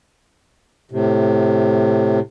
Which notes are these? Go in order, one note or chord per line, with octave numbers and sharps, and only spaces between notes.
A2 C3